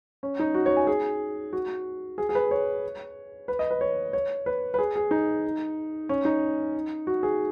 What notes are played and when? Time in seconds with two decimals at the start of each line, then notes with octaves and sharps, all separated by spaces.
0.23 C#4
0.39 D#4
0.55 F#4
0.66 C#5
0.77 G#5
0.87 G#4
1.53 F#4
2.18 G#4
2.29 G#4
2.35 B4
2.51 C#5
3.48 B4
3.59 D#5
3.71 B4
3.81 C#5
4.13 C#5
4.46 B4
4.74 B4
4.79 G#4
4.96 G#4
5.11 D#4
6.09 C#4
6.25 D#4
7.07 F#4
7.23 G#4